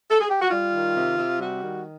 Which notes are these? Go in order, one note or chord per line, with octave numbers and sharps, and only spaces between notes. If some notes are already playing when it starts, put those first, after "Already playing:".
A4
G#4
G4
F#4
G3 F4
D#3
C3
C3
G3 F#4
D#3